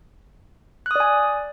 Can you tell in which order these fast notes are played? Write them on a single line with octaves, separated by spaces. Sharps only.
F#6 D#6 D5 G#5